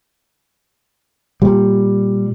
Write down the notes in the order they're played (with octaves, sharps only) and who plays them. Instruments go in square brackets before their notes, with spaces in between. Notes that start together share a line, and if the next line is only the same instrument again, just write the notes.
[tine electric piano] A#2 [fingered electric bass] G3